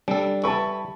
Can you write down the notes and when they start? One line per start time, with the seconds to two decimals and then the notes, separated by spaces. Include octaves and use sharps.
0.08 G3 D4 A4
0.44 E4 B4 A5 C#6